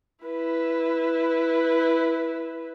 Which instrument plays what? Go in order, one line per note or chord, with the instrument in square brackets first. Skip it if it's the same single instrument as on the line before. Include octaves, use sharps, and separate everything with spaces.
[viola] E4 B4